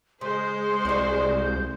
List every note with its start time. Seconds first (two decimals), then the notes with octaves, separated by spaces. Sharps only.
0.21 C#3 G#3 C5 C6
0.85 C2 F#4 D5
1.41 G6